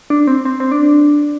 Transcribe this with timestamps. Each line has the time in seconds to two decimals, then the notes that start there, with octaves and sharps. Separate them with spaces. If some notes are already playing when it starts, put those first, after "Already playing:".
0.10 D4
0.27 C4
0.45 C4
0.60 C4
0.72 D4